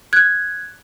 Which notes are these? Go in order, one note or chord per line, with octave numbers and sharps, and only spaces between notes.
F#6 G#6